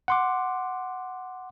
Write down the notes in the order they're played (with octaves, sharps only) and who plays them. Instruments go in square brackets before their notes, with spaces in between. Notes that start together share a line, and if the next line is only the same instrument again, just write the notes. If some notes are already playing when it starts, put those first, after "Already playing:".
[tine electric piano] F#5 C6 D6